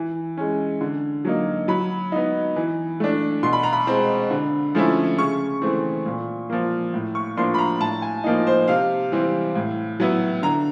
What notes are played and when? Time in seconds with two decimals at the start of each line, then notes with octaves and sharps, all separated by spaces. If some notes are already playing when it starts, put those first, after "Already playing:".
Already playing: E3
0.37 G#3 C#4
0.81 D3
1.25 F#3 A#3 D#4
1.68 F#3 B5
2.12 B3 D#4
2.56 E3
3.00 A3 D4
3.43 B2 C6
3.53 B5
3.63 A#5
3.73 B5
3.87 G#3 C4
4.30 D3
4.75 F3 A3 C#4 E4
5.18 C#3 C#6
5.62 E3 A3 C4
6.06 A#2
6.50 F3 A#3
6.94 A2
7.15 C#6
7.37 F3 A#3 D4 C6
7.54 B5
7.58 A#5
7.80 A2 A5
8.02 G#5
8.24 F3 A#3 D#4
8.47 C5
8.68 C3 F5
9.12 E3 G3 C4
9.56 A2
10.00 F#3 B3 E4
10.43 D3 A#5